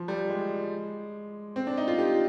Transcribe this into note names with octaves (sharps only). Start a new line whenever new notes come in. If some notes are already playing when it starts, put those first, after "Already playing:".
Already playing: F3
G3
G#3
C4
D4
D#4
F4
G4